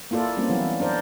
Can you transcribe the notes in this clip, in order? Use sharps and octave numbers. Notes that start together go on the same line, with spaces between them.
A#3 E4 F4 A4 D5
G3 A#3 C4 C#4
E3 F#3 B3 E4
D4 A#4 C5 D5